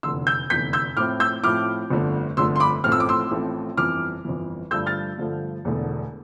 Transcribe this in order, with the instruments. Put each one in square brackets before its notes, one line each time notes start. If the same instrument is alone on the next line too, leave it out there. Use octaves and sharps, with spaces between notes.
[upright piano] F1 E2 D3 C6 E6
E6 G6
F1 E2 D3 G6 B6
E6 G6
A2 F3 C4 E4 D6 F6
E6 G6
A2 F3 C4 E4 D6 F6
G1 F2 D3 A3
G1 F2 D3 A3 C6 E6
C6
B5 D6
A1 A2 F3 A3 C4 F6
E6
D6
C6 E6
A1 A2 F3 A3 C4
G1 F2 E3 D6 F6
G1 F2 E3
G2 D3 F3 A3 E6 G6
F6 A6
G2 D3 F3 A3
E1 E2 D3 A3